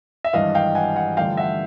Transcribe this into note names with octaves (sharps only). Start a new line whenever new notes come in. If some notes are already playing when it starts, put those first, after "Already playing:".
E5
G#1 G2 E3 D#5 F5
F5 G5
F#5 G#5
F#5 G#5
A1 G2 D3 F3 F5 G5
E5 F#5